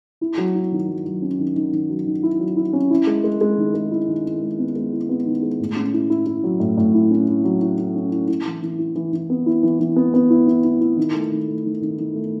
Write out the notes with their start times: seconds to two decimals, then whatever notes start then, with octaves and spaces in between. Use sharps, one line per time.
0.21 E4
0.38 F#3
0.55 E4
0.72 D#3
0.89 F#3
1.05 F#3
1.22 C#4
1.39 D#3
1.56 D#3
1.73 D#3
1.89 F#3
2.06 D#3
2.23 E4
2.40 F#3
2.56 E4
2.73 C#4
2.90 E4
3.07 G#3
3.24 G#3
3.41 G#3
3.58 D#3
3.74 G#3
3.91 E4
4.08 D#3
4.25 E4
4.42 G#3
4.58 B3
4.76 G#3
4.93 E4
5.09 B3
5.26 D#3
5.43 G#3
5.60 A2
5.76 C#4
5.94 E4
6.10 E4
6.26 E4
6.43 F#3
6.60 A2
6.77 A2
6.94 E4
7.11 C#4
7.28 E4
7.44 F#3
7.62 E4
7.78 E4
7.95 C#4
8.12 E4
8.28 E4
8.46 E3
8.62 E3
8.79 E4
8.96 E3
9.13 E3
9.30 B3
9.46 E4
9.63 E3
9.80 E3
9.96 B3
10.14 B3
10.30 E4
10.47 E4
10.64 E4
10.81 E4
10.97 D#3
11.14 A3
11.31 D#3
11.48 A3
11.65 D#3
11.81 D#3
11.98 D#3
12.15 A3